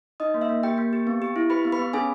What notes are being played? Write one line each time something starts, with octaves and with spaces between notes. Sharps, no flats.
D#4 D#5 D#6
A#3
E5 E6
A#3
A#3 G4 G5
A#3
G4
B3
G4
E4
G4 B4 B5
B3
B4 B5
B3
C#4 G#4 G#5